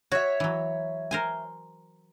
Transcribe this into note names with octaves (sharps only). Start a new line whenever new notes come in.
F#4 C#5 E5
E3 F#3
A#4 C5 G#5